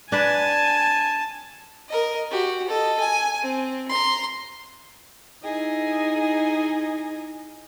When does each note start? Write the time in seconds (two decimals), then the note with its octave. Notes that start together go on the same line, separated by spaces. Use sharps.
0.12 D4 B4 G#5 A5
1.88 A#4 D#5
2.31 F#4 G4
2.67 A4 D#5
3.00 G#5
3.42 C4
3.89 A#5 C6
5.44 D#4 E4 G#4 D#5